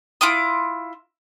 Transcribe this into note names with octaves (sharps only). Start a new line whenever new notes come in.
E4 F4 D6 D#6